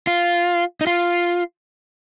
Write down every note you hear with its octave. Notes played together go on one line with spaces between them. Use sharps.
F4
D#4
F4